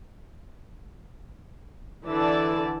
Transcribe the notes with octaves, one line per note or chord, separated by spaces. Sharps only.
D3 E3 E4 D5 A5